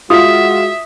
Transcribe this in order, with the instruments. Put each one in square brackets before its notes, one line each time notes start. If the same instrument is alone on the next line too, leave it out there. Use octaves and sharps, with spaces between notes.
[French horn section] G#3 F#4 [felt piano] F4 [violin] E5 [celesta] D#6